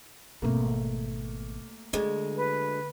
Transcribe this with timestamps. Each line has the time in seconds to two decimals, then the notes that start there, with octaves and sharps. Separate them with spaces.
0.42 G#1 B2 A3 A#3 A#4
1.93 D2 D3 G#3
2.36 B4